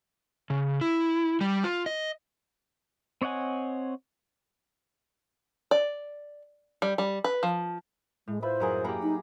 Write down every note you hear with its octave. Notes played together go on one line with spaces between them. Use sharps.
C#3
E4
G3
F4
D#5
C4 C#5 D#5 F#5 G#5
D5
G3
G3
B4
F3
A2 G#3
F4 B4 C5 E5
F#2 G#4 A#4 F#5
A#3 G4 F#5 A#5 B5
D#4